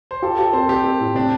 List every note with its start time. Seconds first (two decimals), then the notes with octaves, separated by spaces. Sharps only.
0.11 C5
0.22 G4 A4
0.38 G4 A4
0.53 C4 C5
0.69 C4 G4
0.84 C4
1.00 A2
1.15 C3 D4